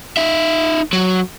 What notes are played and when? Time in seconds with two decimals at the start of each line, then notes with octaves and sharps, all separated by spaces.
0.17 D#4 E5
0.93 F#3